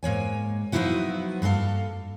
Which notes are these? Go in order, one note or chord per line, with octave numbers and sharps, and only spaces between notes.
G#2 A#3 C#5 G#5
F3 F#3 B3 D#4 E4 F#4
G2 A#3 F#4 A4 F5